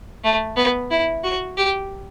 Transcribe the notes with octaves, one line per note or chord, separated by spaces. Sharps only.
A3
B3
E4
F#4
G4